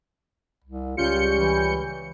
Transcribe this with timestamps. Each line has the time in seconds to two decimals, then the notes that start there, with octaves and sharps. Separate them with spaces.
0.64 C2
0.97 C#2 G3 C#4 F4 G6 C#7
1.37 E3